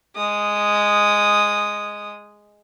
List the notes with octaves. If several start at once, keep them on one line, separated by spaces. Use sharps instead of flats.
G#3 D#6